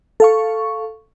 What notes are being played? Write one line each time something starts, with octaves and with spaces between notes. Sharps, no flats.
A4 F5 C#6